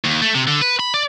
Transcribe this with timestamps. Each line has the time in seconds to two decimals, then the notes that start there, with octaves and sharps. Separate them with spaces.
0.04 D#2
0.22 A3
0.35 C3
0.47 D3
0.62 B4
0.80 B5
0.94 D5